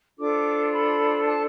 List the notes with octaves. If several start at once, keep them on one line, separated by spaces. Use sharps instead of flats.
D4 F4 A4 C5 D6
B5
A5